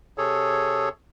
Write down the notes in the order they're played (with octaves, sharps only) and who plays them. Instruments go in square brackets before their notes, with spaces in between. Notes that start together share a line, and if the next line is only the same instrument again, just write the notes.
[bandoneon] C3 G#4 A4 C#5